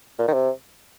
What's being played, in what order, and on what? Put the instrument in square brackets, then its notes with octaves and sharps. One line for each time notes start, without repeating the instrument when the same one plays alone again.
[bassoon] A#2
D#3
C3